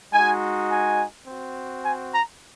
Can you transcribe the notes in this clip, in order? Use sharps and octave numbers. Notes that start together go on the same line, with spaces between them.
G#3 D#4 F#4 G#5
G#5
C4 F#4
G#5
A#5